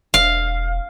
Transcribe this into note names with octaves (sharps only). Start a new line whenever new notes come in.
E1 F5